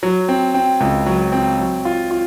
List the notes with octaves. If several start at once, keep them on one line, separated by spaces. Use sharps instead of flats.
F#3
C4
C4
C#2
F#3
C4
F#3
F4
F4